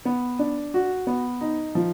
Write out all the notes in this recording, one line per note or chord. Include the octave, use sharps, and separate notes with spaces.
B3
D4
F#4
B3
D#4
F3